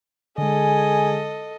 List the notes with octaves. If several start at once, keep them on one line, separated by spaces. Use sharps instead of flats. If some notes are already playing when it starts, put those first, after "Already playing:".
D3 G#3 G#4 A4 D#5 G#5